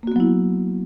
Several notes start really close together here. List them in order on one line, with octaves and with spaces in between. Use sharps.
A#3 F#4 B3 F#3 E4